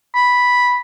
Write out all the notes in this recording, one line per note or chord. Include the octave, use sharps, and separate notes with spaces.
B5